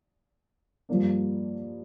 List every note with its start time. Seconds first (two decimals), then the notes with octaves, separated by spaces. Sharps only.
0.89 G2 F3 A#3 D4